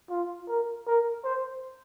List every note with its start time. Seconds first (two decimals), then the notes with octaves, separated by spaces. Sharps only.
0.10 F4
0.48 A#4
0.87 A#4
1.24 C5